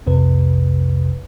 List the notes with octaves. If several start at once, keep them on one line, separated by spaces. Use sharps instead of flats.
B1 F2 C3 B4